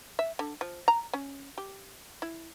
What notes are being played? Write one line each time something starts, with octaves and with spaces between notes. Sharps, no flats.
E5
D3
F3
A#5
C#4
G4
E4